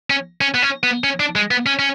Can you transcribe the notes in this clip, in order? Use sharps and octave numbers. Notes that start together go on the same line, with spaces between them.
C#4
C#4
B3
C#4
B3
C#4
D4
G#3
B3
C#4
C#4